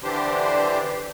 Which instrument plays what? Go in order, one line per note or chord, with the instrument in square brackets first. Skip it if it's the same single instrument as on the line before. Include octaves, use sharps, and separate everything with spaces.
[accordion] D3 E3 D4 G4 C5